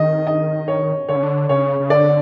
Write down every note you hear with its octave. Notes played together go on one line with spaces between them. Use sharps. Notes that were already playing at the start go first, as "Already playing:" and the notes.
Already playing: D#3 D#5
D#5
C#5
D3 C#5
C#3
D3
C#3 C#5
C#3
D3 D5